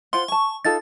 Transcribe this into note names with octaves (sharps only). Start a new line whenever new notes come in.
F4 C5 F#5 C6
G#5 A5 C#6
D#4 F4 A4 A6